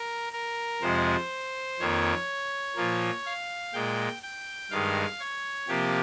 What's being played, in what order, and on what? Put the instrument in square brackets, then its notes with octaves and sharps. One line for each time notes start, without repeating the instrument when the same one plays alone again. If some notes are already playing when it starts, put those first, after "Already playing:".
Already playing: [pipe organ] A#4
A#4
F2 C3 F3 G#3 C5
F2 D#3 A#3 C#5
A#2 F3 A#3
F5
A#2 G#3 G5
G5
G2 D#3 G#3 F5
C#5
C3 F3 A#3 G4